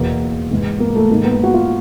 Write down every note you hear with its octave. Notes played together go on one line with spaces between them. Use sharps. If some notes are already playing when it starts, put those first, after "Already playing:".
Already playing: E2 B2 A#3
G#2 E3
A#3
A3
G#2 D#3 A#3
B3
F#4
F4